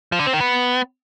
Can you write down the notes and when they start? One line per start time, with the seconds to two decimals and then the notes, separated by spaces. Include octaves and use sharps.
0.12 F3
0.19 D3
0.26 C4
0.33 D#3
0.40 B3